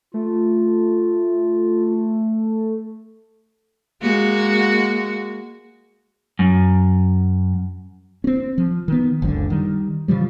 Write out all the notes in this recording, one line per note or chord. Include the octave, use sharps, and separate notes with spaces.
A3 F4
G#3 A#3 F#4
F#2
C4 C#4
F3
D#3 B3
F#1 C#2 F#2 D3
D#3 G3
C#3 E3 F3 G3